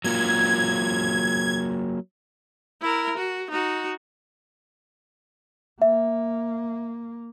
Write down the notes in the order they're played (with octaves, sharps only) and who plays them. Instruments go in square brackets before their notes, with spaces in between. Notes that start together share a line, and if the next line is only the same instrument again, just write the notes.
[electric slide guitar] F#3 A#3 F4 [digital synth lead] G#6
[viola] E4 A#4
F#4
D#4 F#4
[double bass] A#3 [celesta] E5